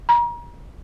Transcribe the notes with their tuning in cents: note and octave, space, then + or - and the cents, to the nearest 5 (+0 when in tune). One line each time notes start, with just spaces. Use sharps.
A#5 +35